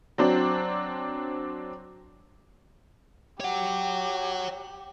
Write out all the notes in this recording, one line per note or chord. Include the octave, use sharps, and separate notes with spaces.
F#3 C4 D4
G4 C#5 F#5